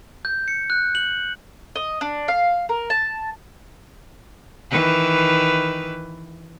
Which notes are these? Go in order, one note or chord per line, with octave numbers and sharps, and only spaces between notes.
G6
C#7
F#6
F#7
D#5
D4
F5
A#4
A5
D#3 E3 B4